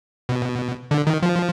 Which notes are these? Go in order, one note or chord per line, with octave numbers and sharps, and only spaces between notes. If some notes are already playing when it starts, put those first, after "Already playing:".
B2
D3
D#3
F3